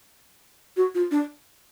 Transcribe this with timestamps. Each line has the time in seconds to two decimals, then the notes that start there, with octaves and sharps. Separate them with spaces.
0.77 F#4
0.95 F4
1.11 D4